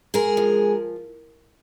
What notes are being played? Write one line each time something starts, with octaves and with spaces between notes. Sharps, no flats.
G#3 G#4 A#4
F3